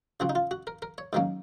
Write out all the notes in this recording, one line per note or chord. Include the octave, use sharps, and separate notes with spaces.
C#3 F3 C4 F#4
D#4
F4
F#4
A#4
A#4
C#5
G#2 D#3 F#3 A#3 C#4